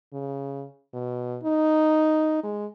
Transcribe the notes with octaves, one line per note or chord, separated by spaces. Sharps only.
C#3
B2
D#4
G#3